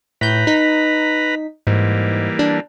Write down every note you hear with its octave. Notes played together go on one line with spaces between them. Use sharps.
A2 B4 A#5 B5 G6
D#4 B6
G#2 E3 G3 A#3
D4